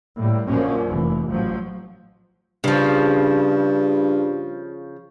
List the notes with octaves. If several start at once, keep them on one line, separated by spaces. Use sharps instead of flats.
A2 G3 A#3
A#1 F#2 D3 F3 A#3 C#4
F1 E3
A1 F3 F#3
G2 C#3 F3